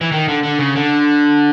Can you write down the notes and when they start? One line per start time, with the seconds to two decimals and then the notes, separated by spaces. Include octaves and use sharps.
0.01 E3
0.11 D#3
0.28 D3
0.43 D3
0.59 C#3
0.76 D3